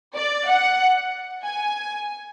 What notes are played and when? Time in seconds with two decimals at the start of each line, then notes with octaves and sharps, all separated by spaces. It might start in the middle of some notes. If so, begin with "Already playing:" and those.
0.16 D5
0.48 F#5
1.45 G#5